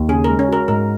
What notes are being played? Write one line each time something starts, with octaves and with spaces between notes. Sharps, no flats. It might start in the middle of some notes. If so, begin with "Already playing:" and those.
Already playing: D#2
C#3 G#4
A#4
G#3
C#4
F#4 A#4
G#2 A#4